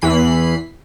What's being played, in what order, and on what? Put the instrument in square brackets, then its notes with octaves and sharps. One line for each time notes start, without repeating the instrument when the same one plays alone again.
[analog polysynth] E2 E3 B5 C7